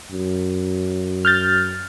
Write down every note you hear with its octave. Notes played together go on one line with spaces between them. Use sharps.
F#2
F6 G6 A6